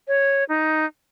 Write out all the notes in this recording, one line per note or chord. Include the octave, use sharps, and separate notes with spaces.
C#5
D#4